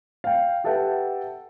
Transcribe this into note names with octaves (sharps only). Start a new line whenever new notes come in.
F5 G5
G4 A4 B4 E5 F#5 G5